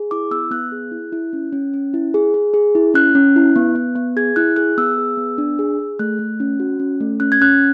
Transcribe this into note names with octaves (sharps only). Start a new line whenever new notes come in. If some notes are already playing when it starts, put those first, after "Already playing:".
Already playing: G#4
E4 D6
B3 E6
B3 F#6
G#4
E4
E4
C#4
C#4
C#4
E4
G#4
G#4
G#4
E4
C#4 F#6
C#4
E4
B3
B3
B3
G#4 G#6
E4 F#6
G#4 F#6
B3 E6
G#4
B3
D4
G#4
G#4
A3 F#6
A3
C#4
F#4
C#4
A3
C#4 F#6
G#6
C#4 F#6